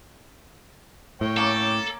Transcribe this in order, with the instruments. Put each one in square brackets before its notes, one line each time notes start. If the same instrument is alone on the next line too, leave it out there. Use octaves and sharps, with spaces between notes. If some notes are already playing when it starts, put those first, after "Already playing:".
[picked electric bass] A2 [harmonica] C#5 G5
[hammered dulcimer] A#3 C#4 [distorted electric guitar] A4